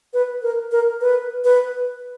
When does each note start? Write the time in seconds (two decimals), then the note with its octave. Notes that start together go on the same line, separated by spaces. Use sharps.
0.14 B4
0.43 A#4
0.72 A#4
1.01 B4
1.45 B4